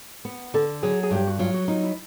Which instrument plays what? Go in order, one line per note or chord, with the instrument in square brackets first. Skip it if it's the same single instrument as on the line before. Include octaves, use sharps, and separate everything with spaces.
[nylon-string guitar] B3
[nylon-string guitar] D3 [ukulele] A4
[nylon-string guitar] F#3 [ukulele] G#4
[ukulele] G#4
[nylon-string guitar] G2 [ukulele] G4
[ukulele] F#4
[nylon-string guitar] F#3 [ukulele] F4
[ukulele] F#4
[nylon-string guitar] D#4 [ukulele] F4
[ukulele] E4